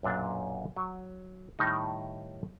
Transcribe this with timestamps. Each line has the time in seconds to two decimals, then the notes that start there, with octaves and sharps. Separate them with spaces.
0.03 B1 F#2 A#2 D4
0.76 F#3
1.59 A2 D#3 G3 D#4